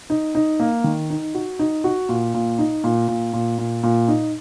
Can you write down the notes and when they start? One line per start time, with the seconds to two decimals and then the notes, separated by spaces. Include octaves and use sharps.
0.10 D#4
0.35 D#4
0.60 A#3
0.84 D#3
1.10 D#4
1.34 F#4
1.59 D#4
1.84 F#4
2.09 A#2
2.34 A#2
2.59 D#4
2.84 A#2
3.08 A#2
3.33 A#2
3.58 A#2
3.83 A#2
4.08 D#4